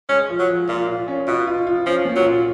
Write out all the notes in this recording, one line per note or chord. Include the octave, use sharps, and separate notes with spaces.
G#3 C#4
F3
F#3
F3
A#2 F4
F4
C#4
B2 F4
F4
F4
F3 C#4
A#2
F#3
F4